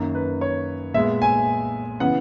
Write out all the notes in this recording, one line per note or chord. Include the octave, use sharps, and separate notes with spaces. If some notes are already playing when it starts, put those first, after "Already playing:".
Already playing: F#2 D#3 A#3
B4
C#5
A#2 G#3 B3 E5
G#5
C#3 E3 B3 F#5